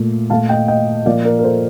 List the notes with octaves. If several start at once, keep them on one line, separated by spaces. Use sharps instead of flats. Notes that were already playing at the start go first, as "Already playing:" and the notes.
Already playing: A#2 A3
A#2 A3 F5 A5
D#5 G5
D#5 G5
A#2 F3 A#3 D5 F5
A#4 D5
A#4
A4 C5